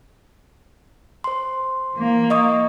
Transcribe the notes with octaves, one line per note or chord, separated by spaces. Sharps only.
C5 C6
E3 A#3
D#5 C#6 D#6